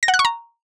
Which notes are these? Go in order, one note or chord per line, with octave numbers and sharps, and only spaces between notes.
A#6
F#5
F#6
C#6
A#5